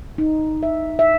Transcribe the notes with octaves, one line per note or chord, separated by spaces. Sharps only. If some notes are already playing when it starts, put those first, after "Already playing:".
D#4
E5
E5